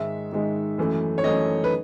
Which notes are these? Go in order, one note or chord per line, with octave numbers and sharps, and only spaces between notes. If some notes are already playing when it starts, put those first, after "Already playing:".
Already playing: G#2 D#3 G#3 E5
G#2 D#3 G#3
F#2 E3 A3
C#5
F#2 E3 A3 D#5
B4